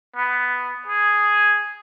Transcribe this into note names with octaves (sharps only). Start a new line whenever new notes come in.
B3
G#4